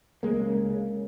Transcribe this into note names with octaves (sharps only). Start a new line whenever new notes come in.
C#2 G#3 A#3
C#3
C#2
C#3